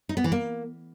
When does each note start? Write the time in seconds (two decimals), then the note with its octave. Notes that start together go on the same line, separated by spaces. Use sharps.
0.09 D#4
0.17 B3
0.24 E3
0.32 A#3